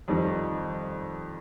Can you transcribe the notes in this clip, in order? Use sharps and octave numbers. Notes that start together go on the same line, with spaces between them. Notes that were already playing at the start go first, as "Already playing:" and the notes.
F2 D#3 G3